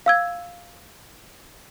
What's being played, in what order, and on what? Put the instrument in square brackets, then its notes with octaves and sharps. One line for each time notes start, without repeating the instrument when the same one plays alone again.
[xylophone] F5 E6 G#6